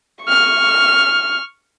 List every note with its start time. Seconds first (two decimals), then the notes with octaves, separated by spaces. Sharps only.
0.24 C#6 F6